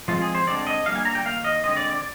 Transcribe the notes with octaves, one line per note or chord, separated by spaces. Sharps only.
F3 G#3 C4 F4
G#4
C5
D3 G#3 C4 D5
D#5
D3 G3 A#3 F5
G#5
A#5
G5
D#3 A#3 F5
D#5
D3 G#3 C4 D#5
D5
D5